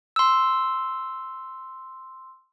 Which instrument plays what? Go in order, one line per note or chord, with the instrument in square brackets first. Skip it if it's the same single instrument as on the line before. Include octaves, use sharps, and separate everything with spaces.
[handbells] C6 E6